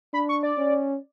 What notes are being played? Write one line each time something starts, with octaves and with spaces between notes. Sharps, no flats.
D4 B5
C#6
D5
C#4